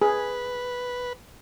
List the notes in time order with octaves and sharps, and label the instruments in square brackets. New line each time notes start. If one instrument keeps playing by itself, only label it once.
[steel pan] G#4 [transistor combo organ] B4